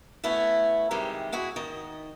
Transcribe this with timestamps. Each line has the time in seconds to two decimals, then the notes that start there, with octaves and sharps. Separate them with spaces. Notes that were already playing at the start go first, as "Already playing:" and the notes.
0.24 A3 B3 C#4 E4
0.91 C3 D#3 G3 G#3
1.32 E4 F#4 G#4
1.56 D#3 D#5